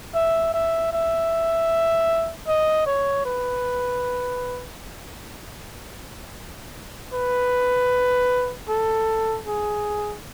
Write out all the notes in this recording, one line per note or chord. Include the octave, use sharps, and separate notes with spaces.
E5
E5
E5
D#5
C#5
B4
B4
A4
G#4